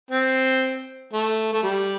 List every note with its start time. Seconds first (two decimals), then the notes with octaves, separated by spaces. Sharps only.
0.11 C4
1.13 A3
1.53 A3
1.63 G3